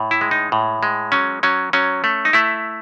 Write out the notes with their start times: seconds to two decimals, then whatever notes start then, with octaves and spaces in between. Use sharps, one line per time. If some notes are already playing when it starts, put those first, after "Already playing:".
Already playing: A2
0.11 E4
0.21 G#3
0.31 D#4
0.52 A2
0.83 G#3
1.12 F#3 C#4
1.43 F#3 C#4
1.73 F#3 C#4
2.04 A3
2.25 D#4
2.33 A3 E4